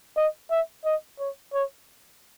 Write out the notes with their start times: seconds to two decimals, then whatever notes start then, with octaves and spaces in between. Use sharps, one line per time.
0.17 D#5
0.51 E5
0.85 D#5
1.19 C#5
1.53 C#5